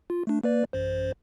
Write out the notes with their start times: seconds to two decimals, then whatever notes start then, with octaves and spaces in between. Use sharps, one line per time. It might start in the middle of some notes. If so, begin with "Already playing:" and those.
0.10 F4
0.27 A3 D4
0.44 A#3 B4 D5
0.73 A1 F#2 C5